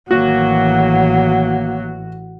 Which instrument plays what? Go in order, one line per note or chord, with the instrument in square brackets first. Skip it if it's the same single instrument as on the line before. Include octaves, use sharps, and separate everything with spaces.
[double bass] A1 E3 [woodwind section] D#3 A#3 [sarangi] F#3 [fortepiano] F#4